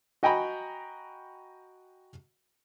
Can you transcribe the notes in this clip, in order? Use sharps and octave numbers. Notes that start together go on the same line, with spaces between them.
F#4 D#5 G5 G#5 A#5 B5